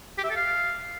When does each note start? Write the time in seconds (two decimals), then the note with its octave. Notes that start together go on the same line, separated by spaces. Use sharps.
0.18 G4
0.24 E5
0.30 A4
0.36 F5